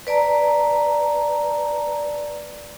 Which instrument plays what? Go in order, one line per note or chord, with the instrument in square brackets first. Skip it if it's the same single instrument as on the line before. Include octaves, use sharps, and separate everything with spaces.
[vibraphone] B4 D5 A5 A#5